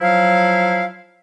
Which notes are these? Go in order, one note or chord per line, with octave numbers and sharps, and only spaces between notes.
F3 F#3 E4 F5